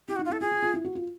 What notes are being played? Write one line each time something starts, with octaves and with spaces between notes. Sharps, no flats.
E4 G4
F#4
D#4
F4
E4 A4
F4 G#4
F4
F4
E4
F#4
F4